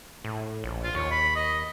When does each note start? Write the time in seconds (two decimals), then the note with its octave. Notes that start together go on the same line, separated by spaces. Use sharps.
0.25 A2
0.64 A#1
0.84 F4
0.95 D#2 C#5
1.11 B5
1.36 D#5